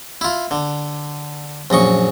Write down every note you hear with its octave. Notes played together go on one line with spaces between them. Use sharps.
E4 F4
D3
A#1 F#2 D#5 C#6